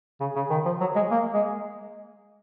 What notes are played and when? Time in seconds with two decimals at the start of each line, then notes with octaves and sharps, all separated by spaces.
0.20 C#3
0.35 C#3
0.50 D#3
0.65 F3
0.81 F#3
0.96 G#3
1.11 A#3
1.34 G#3